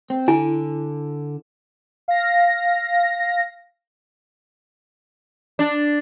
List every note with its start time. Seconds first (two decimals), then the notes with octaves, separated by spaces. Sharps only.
0.10 C4
0.28 D3 E4 G#5
2.08 F5 A#6
5.59 D4